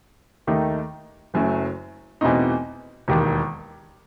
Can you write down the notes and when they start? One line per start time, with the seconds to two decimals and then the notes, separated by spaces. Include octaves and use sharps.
0.47 D#2 D#3 A3 D#4
1.34 F#1 F#2 F#3 A3
2.21 E2 B2 A3 C4 D#4
3.08 E1 D#2 D#3